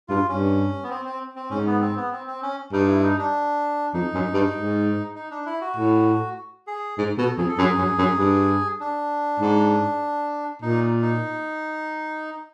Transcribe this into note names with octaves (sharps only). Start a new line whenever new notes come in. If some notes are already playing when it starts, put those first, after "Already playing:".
G2 F4
G2 C#4
B3
C4
C4
C4
G#2 C#4
B3
C4
B3
C4
C4
C#4
G2 D#4
E4
D#4
D4
F2 D#4
F#2
G2
G#2
D#4
D4
E4
F#4
A2
G#4
G#2
B2 A4
F2 G#4
A4
F#2 G#4
F#2
F#2
G2
D4
G#2
A#2 D#4
D#4